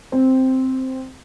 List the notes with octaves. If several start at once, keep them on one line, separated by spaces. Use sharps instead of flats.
C4